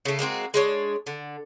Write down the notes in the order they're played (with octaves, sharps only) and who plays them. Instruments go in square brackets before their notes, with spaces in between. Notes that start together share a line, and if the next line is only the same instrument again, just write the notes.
[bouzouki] C#3 A3
G#3 A#3 C4 F#4
G#3 D4 C#5
D3